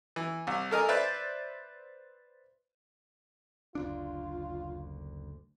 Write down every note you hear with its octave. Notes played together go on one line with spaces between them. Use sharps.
E3
C2
A4 A#4 D#5 G#5
B4 C5 D5 E5
F#1 D2 D4 F4